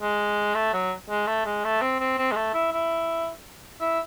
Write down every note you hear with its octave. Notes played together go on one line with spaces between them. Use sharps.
G#3
A3
F#3
G#3
A3
G#3
A3
C4
C4
C4
G#3
A3
E4
E4
E4